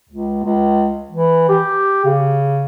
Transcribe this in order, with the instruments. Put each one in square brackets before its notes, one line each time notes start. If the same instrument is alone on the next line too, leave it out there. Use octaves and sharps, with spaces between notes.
[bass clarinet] C#2
C#2
E3
G4
C#3